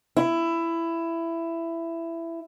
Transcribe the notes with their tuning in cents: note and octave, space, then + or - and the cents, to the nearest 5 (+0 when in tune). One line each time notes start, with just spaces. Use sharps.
E4 +15